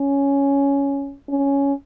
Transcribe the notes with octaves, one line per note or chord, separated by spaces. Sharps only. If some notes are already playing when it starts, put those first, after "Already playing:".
Already playing: C#4
C#4